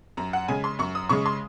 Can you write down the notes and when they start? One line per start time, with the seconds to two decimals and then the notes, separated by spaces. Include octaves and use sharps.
0.17 F#2 A#5
0.33 F#5
0.48 C#3 G#3 G#5
0.64 C6
0.79 F#2 C#6
0.95 D#6
1.09 C#3 G#3 C#6
1.26 C6